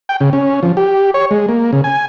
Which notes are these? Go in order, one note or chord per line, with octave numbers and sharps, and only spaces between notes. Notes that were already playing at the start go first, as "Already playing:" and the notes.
G5
C#3
C#4
F3
G4
C#5
G#3
A#3
C#3
G#5